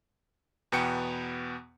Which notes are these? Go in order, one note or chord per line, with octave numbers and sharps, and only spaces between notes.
E2 B2 B3 G5 C#7